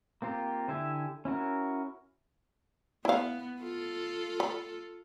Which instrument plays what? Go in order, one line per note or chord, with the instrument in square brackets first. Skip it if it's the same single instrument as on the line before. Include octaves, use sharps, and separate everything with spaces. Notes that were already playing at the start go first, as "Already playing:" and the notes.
[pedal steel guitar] A#3 C4 F4 G4
D3 E4 G4 E5 G#5
C#4 E4 F#4 A#4
[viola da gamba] B3 [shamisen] E4 F5
[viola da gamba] F4 A4
[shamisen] B5